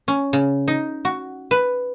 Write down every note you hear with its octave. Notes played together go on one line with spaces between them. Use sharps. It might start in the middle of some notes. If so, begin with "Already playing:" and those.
C#4
C#3
D#4
F#4
B4